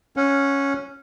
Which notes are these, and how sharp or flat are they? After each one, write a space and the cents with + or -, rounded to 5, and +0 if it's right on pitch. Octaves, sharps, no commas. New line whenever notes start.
C#4 +0 F#5 -25